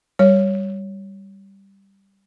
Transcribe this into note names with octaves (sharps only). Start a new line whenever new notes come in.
G3 C#5